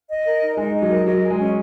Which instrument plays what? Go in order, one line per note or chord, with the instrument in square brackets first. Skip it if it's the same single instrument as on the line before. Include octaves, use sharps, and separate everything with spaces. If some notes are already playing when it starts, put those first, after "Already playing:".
[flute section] D#5
A#4
D#4
[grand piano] G#3 [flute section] D#4
[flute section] D#5
[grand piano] F#3
[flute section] A#4
[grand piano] F#3 [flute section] D#5
[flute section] G#4
[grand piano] G#3
[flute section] C#4